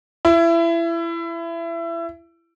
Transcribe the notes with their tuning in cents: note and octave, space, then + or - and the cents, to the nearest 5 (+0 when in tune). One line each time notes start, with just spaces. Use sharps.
E4 +25